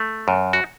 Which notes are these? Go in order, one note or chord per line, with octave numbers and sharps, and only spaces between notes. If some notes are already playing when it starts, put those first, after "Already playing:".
Already playing: A3
F#2
F#4